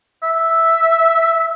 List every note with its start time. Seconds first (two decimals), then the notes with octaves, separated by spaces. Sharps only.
0.23 E5